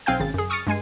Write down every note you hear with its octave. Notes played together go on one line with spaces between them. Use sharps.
B1 C4 F5 G5 G#5 G6
G#1 C#3 A6
F#2 G#4
C#6 D#6 F6 A6 C#7
G2 G#3 G#5 C7